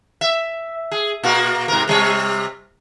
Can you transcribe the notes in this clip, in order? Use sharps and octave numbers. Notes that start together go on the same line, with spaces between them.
E5
G#4
A#2 A#3 F#4
G#2 C3 A#4
C3 G3 C#5